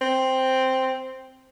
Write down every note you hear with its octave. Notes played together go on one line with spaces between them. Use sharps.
C4